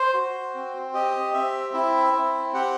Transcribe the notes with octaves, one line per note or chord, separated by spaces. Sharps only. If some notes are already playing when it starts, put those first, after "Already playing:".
Already playing: C5
F#4
C4
G4 D#5
C4 E5
E4 E5
C4
G4 F#5